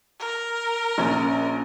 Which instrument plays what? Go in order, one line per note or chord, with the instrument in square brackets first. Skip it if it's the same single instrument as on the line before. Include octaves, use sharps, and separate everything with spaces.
[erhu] A#4
[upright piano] A#1 C#4